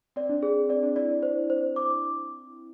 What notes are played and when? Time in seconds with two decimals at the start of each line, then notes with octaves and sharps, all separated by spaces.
0.16 C4 D5
0.29 D4
0.42 C4 G#4
0.69 C4 D5
0.83 D4
0.96 E4 D5
1.23 C5
1.50 C5
1.76 D6